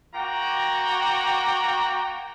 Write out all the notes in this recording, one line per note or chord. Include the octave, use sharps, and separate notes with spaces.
A#3 F#4 G5 A#5